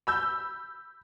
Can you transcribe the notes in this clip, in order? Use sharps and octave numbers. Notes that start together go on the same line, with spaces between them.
B5 E6 G6